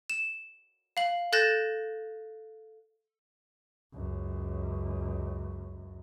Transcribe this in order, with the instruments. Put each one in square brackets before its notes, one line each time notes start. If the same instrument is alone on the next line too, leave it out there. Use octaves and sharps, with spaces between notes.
[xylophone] E7
F5 F#7
A4 F#6 G6 A6 A#6 E7
[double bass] C#2 F#2